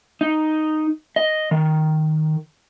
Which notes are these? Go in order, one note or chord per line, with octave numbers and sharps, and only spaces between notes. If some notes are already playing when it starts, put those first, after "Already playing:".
D#4
D#5
D#3